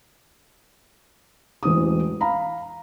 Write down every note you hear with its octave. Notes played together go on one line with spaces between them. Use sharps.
E1 A1 C5 D#6
F5 A#5 B5